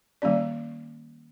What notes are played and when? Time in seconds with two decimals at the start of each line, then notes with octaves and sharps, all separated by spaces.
0.22 D#3 G3 A#3 C#4 D5